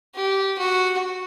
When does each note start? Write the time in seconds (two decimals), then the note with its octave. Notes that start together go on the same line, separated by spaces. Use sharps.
0.16 G4
0.59 F#4